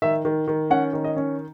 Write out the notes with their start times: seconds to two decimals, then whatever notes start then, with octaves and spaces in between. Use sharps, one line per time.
0.02 D#3 E5
0.25 D#3
0.48 D#3
0.70 C#4 F#5
0.93 D#3
1.04 D#5
1.17 C#4